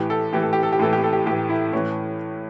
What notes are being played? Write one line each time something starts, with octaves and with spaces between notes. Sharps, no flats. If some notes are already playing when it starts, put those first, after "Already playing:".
Already playing: A2 E3 G4
A4
A2 E3 G4
A4
G4
A4
G4
A2 E3 A4
G4
A4
G4
A2 E3 G4
E4
A2 E3 C#4